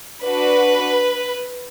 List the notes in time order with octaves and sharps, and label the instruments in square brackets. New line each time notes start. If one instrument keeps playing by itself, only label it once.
[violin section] D4 F#4 B4